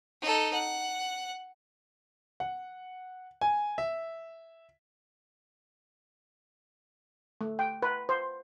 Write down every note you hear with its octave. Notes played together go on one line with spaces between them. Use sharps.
D#4 A4
F#5
F#5
G#5
E5
A3
G5
B4
C5